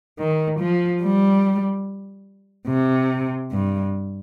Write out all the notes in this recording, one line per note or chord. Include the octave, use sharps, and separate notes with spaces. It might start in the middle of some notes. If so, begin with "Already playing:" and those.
D#3
F3
G3
C3
G2